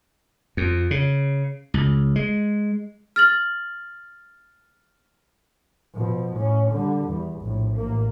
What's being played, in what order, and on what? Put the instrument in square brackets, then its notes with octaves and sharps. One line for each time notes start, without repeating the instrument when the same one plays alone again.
[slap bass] F2
C#3
C#2
G#3
[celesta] F6 A6 F#7
[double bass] B2 F3
A2 C#4
D3 G3
E2
A#1 A2
A1 A#3